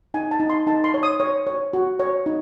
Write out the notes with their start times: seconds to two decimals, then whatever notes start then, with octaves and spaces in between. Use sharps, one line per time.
0.14 D#4 G#5
0.31 A5
0.40 D#4
0.50 C6
0.67 D#4 A5
0.84 C6
0.94 C#5
1.03 D#6
1.20 C#5
1.47 C#5
1.73 F#4
1.99 C#5
2.26 D#4